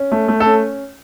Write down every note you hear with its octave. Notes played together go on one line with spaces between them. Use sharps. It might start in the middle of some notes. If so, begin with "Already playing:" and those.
Already playing: C#4
A3
A3
A4
C#4